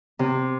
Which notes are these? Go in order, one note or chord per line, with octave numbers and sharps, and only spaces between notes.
C3